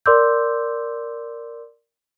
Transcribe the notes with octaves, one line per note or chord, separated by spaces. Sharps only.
A#4 D5 C6 D6 E6 G6